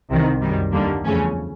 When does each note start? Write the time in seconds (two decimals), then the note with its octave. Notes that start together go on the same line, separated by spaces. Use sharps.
0.10 C2 C3 D#3
0.41 F#2 D#3 G3
0.72 D#2 D3 G3 A#3
1.04 E2 C#3 F3 A3 C#4